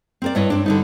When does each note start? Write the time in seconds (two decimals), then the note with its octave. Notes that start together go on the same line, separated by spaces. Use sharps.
0.22 C4 A#4 D5
0.35 G2 E4 C#5 D#5
0.50 C4 D4
0.66 D3 G3 D#4